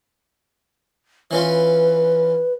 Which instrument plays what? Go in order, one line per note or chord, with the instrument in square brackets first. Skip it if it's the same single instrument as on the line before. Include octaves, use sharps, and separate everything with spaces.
[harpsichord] E3 C#4 F4 [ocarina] B4